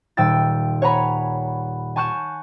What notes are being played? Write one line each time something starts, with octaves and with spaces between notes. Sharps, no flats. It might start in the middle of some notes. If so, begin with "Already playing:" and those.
D#1 G5 E6 A6
C#5 F#5 G#5 A#5 B5
G#5 A5 C#6 F#6 G6 E7